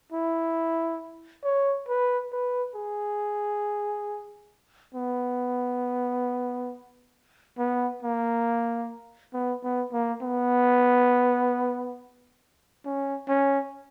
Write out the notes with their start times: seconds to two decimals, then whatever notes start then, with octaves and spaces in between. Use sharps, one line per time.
0.12 E4
1.44 C#5
1.88 B4
2.32 B4
2.75 G#4
4.95 B3
7.58 B3
8.03 A#3
9.34 B3
9.64 B3
9.92 A#3
10.22 B3
12.86 C#4
13.29 C#4